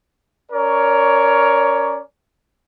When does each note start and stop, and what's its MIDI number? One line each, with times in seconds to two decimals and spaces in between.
0.52 2.00 61
0.52 2.00 70
0.52 2.00 73
0.52 2.00 74